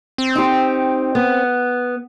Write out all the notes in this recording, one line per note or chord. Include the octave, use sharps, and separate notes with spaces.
C4
D#4 G4
B3